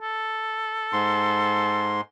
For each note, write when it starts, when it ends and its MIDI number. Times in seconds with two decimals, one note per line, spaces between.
0.01 2.03 69
0.93 2.01 44
0.93 2.01 84